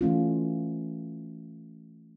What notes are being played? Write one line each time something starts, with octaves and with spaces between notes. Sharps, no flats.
E3 A3 C#4 F4